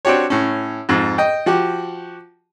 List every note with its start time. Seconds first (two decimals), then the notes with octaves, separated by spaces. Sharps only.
0.05 C4 D4 F#4 G4 C#5
0.30 A2 C#4
0.89 F2 G#2
1.18 D#5 G5
1.46 F3 F#4 G4